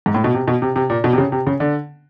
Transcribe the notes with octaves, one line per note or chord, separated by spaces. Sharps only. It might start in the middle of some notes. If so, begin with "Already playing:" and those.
G#2
A2
B2
C3
B2
C3
C3
A#2
B2
C3
C#3
C3
C#3
D3